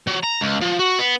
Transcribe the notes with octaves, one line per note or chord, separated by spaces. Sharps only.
F#3
A#5
C#2
F3
F#4
B3